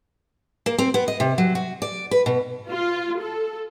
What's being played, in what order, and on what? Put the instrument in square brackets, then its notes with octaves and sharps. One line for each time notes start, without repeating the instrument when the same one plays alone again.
[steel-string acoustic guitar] A#3
C4
B3
D#5
C3
F#3
F#4
D5
B4
B2
[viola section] F4
A4